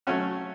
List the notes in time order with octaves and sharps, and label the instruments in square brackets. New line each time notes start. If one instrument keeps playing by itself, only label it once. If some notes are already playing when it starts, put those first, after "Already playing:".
[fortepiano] F#3 A3 C#4 F#4